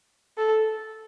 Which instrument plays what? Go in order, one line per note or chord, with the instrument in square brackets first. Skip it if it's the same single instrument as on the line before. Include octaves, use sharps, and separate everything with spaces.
[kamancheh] A4